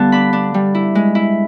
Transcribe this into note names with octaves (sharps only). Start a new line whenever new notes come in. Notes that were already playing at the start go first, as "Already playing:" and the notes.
Already playing: D3 G3 B3 F5 A5
D4 B5
D4
G3
E4
G#3
E4